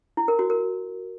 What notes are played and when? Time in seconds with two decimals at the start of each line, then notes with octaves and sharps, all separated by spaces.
0.17 E4
0.28 A#4
0.39 F#4
0.50 A#4